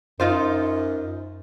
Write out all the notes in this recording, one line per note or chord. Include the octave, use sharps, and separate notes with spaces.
F#2 D#4 F4 C5